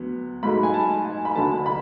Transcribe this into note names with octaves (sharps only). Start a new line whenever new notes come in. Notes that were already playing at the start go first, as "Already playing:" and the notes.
Already playing: D2 F#3 B3
G#2 F#3 A3 B5
G#5
A5
G#5
B5
D2 D3 F#3 A3 A5
B5